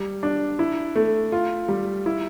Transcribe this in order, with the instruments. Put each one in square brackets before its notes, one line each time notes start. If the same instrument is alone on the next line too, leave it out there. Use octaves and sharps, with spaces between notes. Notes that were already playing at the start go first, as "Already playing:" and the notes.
Already playing: [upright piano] G3
D4
E4
A3
F4
G3
E4